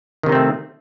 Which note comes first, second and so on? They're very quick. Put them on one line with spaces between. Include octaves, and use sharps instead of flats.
D#3 C3 D#4 C4 A3